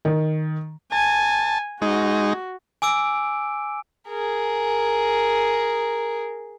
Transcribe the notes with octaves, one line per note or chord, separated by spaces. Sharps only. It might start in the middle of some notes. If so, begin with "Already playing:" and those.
D#3
G#5 A5
G#3 D#4 F#4
G#5 D6 E6 D7
G#4 A#4